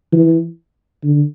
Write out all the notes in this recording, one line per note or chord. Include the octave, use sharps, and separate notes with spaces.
E3
D3